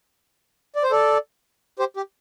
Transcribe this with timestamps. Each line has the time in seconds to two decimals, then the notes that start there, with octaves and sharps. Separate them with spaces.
0.75 D5
0.83 C5
0.91 A4 D5
1.79 G4 C5
1.97 G4